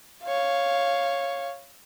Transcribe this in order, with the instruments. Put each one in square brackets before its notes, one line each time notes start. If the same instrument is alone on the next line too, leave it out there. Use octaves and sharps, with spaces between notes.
[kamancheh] C#5 F5